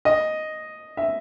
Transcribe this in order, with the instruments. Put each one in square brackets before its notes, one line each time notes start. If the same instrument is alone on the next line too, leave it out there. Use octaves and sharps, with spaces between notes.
[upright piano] D#5
E5